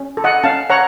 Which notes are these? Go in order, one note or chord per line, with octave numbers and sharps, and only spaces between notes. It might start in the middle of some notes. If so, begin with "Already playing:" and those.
Already playing: C#4
A4
D#5 F#5
C#4 F5 A5
C#5 F#5 A#5